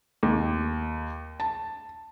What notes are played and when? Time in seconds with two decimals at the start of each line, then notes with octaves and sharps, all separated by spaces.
0.23 D#2
1.40 A5